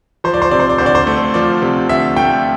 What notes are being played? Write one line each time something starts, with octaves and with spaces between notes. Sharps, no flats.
F3 C5
D5
C5
C3 D5
C5
D5
D2 C5
D5
C5
A3
F3 D5
C3
D2 E5
A3 G5